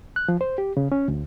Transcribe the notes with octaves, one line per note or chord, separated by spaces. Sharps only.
F#6
F3
C5
G4
C#3
C#4
D2